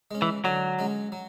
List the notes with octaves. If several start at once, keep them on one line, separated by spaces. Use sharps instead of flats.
G#3 C#4
E3
D3 F#3
G#3 C#4
F#3